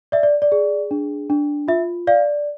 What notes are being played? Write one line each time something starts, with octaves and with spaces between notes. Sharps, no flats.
D5 E5
D5
D5
G#4
D4
D4
F4 E5
D5 F5